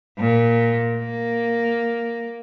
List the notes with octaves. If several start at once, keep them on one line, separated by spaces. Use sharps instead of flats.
A#2
A#3